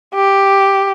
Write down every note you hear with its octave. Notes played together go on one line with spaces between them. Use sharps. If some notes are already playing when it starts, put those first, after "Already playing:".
G4